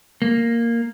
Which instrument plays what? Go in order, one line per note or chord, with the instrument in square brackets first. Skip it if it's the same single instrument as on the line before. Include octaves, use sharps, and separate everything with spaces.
[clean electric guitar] A#3